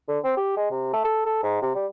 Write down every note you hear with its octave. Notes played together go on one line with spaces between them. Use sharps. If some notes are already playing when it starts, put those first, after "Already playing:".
D3
C4
G4
G#3
C3
A3
A4
A4
G#2
C3
G3